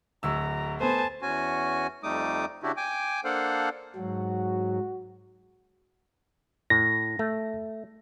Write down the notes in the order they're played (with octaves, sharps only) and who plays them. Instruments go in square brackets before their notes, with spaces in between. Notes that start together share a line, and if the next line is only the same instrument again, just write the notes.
[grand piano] D1 D2 E6 [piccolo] A#5
[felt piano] A3 B3 [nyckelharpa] C5 G#5 [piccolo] A5
[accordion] E2 C#4 F#4 G#5
F2 G3 A3 D#4 D6 D#6
C#3 D4 E4 F#4 G4
G5 G#5 D6
A#3 D4 A4 C5 F5 F#5
[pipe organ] G#2 F#3 [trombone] F#4
[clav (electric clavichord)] A2 [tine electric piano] A#6
[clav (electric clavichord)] A3